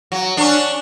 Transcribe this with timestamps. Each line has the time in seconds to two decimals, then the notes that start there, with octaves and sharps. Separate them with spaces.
0.12 F#3
0.37 C#4 D4